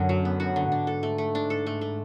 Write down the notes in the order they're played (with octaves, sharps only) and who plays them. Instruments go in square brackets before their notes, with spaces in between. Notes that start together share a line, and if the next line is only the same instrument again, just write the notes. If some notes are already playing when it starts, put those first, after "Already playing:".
Already playing: [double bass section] F#2 [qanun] D3 F#4
[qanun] F#3
B3
F#4
D3
[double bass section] G#2 [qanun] D4
[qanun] A4
A3
A3
D4
A4
A3
A3